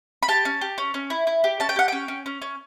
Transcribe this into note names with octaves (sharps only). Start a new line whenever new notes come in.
B5
G4 A5
C#4
G4
C#4
C#4
E4
E4
G4
C#4 A5
G5
G4 F#5
C#4 G5
C#4
C#4
C#4